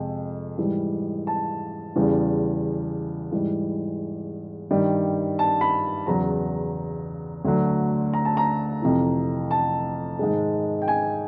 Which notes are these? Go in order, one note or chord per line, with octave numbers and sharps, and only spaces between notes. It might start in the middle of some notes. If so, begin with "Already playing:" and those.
Already playing: F2 C3 G#3
G#2 E3 G3
A5
E2 C#3 E3 G3
G#2 E3 G3
G2 D#3 G3
A5
B5
E2 C#3 F#3 A#5
D2 D3 F#3
A#5
A5
A#5
F2 C3 E3
A5
G#2 D#3 G#3
G5
G#5